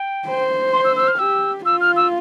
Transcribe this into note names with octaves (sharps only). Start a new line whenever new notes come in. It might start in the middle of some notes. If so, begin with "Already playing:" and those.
Already playing: G5
C5
C6
E6
E6
F6
G4 E6
F4 E6
F6
E6